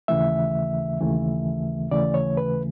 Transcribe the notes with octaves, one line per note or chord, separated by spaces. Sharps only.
D#2 C#3 E3 A3 E5
D#2 C#3 E3 A3
D#2 C#3 E3 A3 D5
C#5
B4